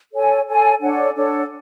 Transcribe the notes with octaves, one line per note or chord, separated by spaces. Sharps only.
A4 C#5 G#5
A4 C#5 G#5
D4 A4 C#5 F#5
D4 A4 C#5 F#5